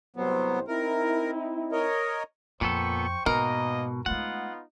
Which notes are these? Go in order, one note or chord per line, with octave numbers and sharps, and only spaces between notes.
C2 A2 F#3 B3 C5
C4 D#4 E4 A#4
A#4 C#5 D#5
F2 A#2 B3 A4 C5 G5 C#6
G#2 B2 A#3 B3 A#4 D#5
G#3 A3 B3 D#4 F4 F#5